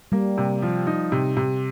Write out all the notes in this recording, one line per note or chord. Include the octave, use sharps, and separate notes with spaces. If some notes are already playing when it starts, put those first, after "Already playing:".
G3 A#3
C3
F3
D#4
C3
C3